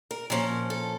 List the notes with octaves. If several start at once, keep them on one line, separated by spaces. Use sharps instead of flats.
A#4
A#2 F3 C#4 A#4
A4